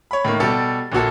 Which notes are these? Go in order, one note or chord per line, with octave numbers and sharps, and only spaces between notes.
C#5 B5
A2 D#3 A#3
B2 G3 A4 A6
A#1 A#2 F#4 A4